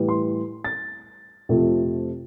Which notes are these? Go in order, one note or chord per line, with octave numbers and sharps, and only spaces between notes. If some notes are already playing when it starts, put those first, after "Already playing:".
Already playing: A2 E3 G3
C6
A6
F2 C3 F3 A3